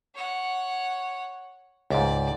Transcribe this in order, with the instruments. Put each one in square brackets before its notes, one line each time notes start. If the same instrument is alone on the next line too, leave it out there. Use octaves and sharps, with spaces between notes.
[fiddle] C#5 F#5
[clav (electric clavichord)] C#2 G#2 [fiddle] D5